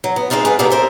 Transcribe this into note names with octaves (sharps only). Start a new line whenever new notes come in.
F#3
B3
G#3 C4 D4 D#4 F4
G#4 B4 F#5
D#2 C3 A#3 B3 D4 A4
A#4 C5 E5